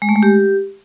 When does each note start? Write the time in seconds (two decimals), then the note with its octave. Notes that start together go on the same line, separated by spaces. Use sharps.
0.02 G#3
0.09 A3
0.16 G#3
0.23 G4